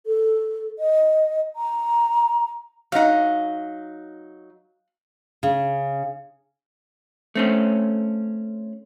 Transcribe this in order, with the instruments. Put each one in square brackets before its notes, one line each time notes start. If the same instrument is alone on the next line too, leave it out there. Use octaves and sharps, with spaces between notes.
[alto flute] A4
D#5
A#5
[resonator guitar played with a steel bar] F#3 D#4 [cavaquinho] F5 F#5
[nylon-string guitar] C#3
[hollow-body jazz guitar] A3 C4 C#4